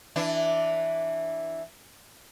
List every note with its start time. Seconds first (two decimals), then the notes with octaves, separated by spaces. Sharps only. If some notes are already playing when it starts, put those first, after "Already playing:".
0.16 E3 D4